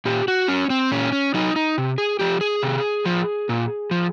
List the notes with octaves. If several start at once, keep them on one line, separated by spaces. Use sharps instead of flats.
A#2 G4
F#4
F#3 C#4
C4
A#2 C#4
C#4
F#3 D#4
D#4
C3
G#4
F3 G4
G#4
C3
F3
A#2
F3